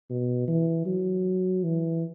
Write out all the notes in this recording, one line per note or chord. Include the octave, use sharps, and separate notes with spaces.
B2
E3
F#3
E3